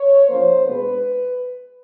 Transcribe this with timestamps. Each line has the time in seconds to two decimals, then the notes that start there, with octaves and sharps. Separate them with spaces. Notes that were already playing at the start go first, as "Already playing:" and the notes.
Already playing: C#5
0.28 F3 A#3 C#4 C5
0.64 B2 G#3 B3 D4 B4